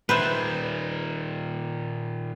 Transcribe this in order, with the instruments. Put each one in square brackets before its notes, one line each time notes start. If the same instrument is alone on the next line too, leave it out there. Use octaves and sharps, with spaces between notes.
[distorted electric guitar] A#2 D#3 [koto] B4 C5 E5